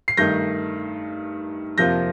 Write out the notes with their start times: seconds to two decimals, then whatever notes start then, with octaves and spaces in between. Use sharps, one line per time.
0.08 C7
0.17 G2 D#3 A3 D#4 G6 A#6
1.78 F2 C3 F3 A#3 F4 G6 A#6